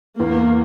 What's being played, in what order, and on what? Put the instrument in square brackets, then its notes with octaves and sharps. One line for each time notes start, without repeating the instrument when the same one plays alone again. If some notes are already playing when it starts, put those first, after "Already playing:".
[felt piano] E2 [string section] A#3